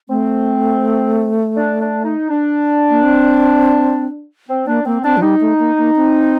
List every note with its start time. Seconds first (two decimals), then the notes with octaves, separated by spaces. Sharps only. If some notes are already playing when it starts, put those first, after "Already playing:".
0.09 A3 C4
1.56 D4
1.81 D4
2.04 D#4
2.30 D4
2.90 A#3
3.03 C4
4.49 C4
4.67 A#3 D4
4.85 A#3 C4
5.04 C4 D4
5.17 F3
5.22 G3 D#4
5.41 A3
5.59 A#3
5.78 A#3
5.96 C4